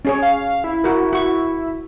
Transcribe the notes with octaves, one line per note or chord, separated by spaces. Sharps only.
C#4 G#4 C#5
F5
E4
F#4 A#4
F#4 C#6